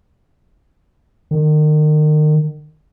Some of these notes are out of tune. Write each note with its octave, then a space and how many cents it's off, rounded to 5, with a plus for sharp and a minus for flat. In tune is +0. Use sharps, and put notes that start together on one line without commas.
D#3 -35